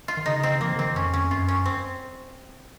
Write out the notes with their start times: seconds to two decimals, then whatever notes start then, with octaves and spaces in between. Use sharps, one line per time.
0.08 F4
0.17 D#3
0.26 C#3 D#4
0.43 C4
0.61 F3 A#3
0.69 D#3
0.76 C#3
0.79 C4
0.85 D#3
0.96 F2 C#4
1.14 C#4
1.31 F#2 F4
1.48 C#4
1.66 C4